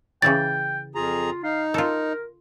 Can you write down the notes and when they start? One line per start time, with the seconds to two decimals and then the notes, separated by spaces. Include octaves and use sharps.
0.22 C#3 E3 D5 G5 A6
0.95 F2 F4 G#4 A#5
1.43 D#4 F5
1.74 F4 A4 A#4